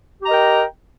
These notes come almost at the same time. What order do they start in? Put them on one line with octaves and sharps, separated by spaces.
G4 A#5 D#5 A#4 G5